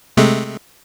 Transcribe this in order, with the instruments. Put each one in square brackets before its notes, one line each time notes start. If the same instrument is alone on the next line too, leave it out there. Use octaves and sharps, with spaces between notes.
[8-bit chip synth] C3 G#3 A3